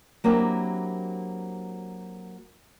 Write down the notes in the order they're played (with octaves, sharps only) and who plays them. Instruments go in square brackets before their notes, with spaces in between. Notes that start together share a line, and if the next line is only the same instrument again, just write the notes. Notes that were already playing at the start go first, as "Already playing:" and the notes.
[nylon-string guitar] F#3 A#3 C4 D4 E4 G4